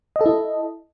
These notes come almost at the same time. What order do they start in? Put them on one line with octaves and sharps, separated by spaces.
D#5 A4 E4